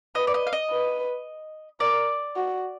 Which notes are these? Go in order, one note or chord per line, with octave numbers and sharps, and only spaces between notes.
B4 D#5
D5
D#5
F5
D#5
B4
A#4 D5
F#4